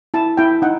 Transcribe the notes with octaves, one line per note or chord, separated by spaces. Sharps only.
E4 A5
E4 G5
D#4 F#5